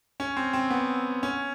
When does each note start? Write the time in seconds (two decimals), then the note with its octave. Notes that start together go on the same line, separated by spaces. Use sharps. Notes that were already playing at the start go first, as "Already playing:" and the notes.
0.20 C#4
0.37 C4
0.53 C4
0.70 B3
1.23 C#4